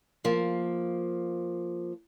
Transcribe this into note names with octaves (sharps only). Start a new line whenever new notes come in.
F3 A#3